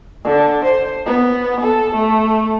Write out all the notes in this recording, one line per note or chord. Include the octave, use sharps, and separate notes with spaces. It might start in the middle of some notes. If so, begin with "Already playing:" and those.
D3
C5
B3
A4
A3